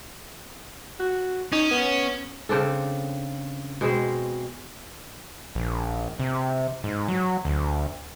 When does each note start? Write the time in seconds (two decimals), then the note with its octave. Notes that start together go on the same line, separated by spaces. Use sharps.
1.00 F#4
1.53 C#4 D#4
1.71 B3
2.49 C#3 C4 D4 A4
3.81 B2 G#3 C4
5.55 A#1
6.20 C3
6.84 G#2
7.08 F#3
7.45 D2